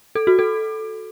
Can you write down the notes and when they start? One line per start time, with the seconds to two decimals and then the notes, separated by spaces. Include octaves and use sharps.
0.15 A4
0.27 F#4
0.39 A4